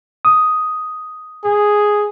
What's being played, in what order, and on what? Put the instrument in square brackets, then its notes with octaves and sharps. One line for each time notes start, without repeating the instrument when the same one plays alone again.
[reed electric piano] D#6
[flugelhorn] G#4